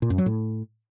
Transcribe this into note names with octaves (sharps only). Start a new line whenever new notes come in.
A#2
F#2
F#3
A2